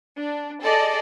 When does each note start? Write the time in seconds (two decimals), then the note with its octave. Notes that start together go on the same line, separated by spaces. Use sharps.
0.17 D4
0.63 G#4 A4 D5 D#5 A5